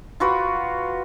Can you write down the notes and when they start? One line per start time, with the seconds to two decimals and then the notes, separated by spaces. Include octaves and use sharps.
0.20 F4 F#4 B4